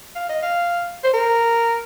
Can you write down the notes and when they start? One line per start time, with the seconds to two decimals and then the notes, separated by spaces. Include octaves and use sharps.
0.16 F5
0.29 D#5
0.42 F5
1.04 C5
1.14 A#4